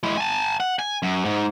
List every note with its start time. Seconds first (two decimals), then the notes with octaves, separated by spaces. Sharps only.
0.03 G#3 E4
0.17 G#5 A5
0.60 F#5
0.79 G#5
1.03 F#2
1.25 G#2